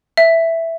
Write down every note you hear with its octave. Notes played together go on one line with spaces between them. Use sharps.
E5